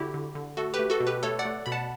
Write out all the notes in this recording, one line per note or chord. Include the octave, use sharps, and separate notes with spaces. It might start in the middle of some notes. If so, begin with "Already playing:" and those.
Already playing: D3 E4 F#4 G4
D3
D3
A3 F#4 A4
G4 B4
A3
F#4 A4
B2
G4 B4
A3 A4 C#5
D5 F#5
A3
B2 B5
F#5 A5